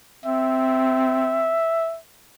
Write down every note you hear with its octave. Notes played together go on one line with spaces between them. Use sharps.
C4 E5